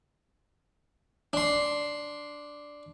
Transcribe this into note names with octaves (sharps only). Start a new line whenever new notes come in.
D4 C6